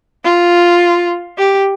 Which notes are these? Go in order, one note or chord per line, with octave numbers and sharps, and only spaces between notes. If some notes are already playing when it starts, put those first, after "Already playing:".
F4
G4